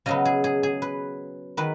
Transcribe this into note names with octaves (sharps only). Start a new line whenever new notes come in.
C#3 F#3 B3 D#5
G#4
G#4
G#4
B4
D#3 B4